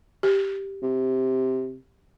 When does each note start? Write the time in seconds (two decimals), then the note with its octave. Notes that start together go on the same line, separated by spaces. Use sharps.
0.23 G4
0.82 C3